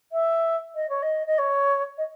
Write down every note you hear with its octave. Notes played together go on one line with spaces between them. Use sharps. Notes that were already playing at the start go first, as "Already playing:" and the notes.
E5
D#5
C#5
D#5
D#5
C#5
D#5